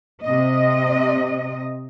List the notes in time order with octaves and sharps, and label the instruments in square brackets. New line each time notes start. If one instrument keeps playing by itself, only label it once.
[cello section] C3 D#5